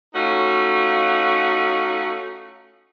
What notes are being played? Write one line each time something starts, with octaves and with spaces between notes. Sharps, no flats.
A3 C#4 D#4 F4 F#4